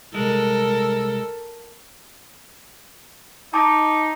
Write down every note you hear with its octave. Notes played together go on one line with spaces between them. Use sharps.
C2 G#3 A4 A#4
D#4 A5 D6